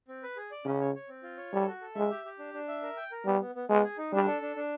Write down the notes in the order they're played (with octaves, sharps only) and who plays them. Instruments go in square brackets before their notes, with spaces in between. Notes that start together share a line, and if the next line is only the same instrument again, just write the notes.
[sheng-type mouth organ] C4
B4
G#4
D5
[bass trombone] C#3 [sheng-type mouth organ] C#4
[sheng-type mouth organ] C#5
C#5
C4
F4
C#5
[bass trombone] G3 [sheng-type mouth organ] A4
[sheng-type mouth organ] F#4
A4
[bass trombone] G#3 [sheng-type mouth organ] E5
[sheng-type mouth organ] G4
G4
D4
D4
E5
A#4
G5
A#4
[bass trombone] G3 [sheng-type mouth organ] B3
[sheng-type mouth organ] B3
B3
[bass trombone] G#3 [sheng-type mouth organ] B3
[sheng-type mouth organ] G#4
D#4
[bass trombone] G3 [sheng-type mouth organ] D4
[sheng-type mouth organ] A4
D4
D4